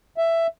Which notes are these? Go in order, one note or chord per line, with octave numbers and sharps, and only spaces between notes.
E5